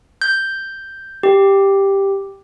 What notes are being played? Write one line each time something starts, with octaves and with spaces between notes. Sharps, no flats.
G6
G4